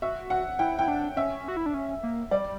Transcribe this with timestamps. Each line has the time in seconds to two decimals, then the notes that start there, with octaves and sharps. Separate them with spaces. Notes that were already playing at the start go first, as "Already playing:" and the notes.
0.02 F#4 E5
0.30 F#5
0.59 E4 G5
0.79 E4 G5
0.88 D4
1.16 C#4 E5
1.48 F#4
1.57 E4
1.66 D4
1.74 C#4
2.03 A#3
2.31 G3 D5